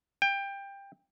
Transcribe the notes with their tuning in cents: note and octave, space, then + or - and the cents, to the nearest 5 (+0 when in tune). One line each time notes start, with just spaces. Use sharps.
G5 +20